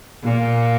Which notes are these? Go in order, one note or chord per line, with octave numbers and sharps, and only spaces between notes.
A#2